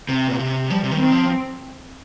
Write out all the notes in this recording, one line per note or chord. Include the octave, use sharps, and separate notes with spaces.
C3
A#2
C3
F3 G3
C3
D#3
C4
F3